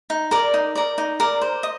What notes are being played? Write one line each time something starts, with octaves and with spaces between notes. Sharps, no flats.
D#4
A#4 D5
D#4
A#4 D5
D#4
A#4 D5
C5
D#5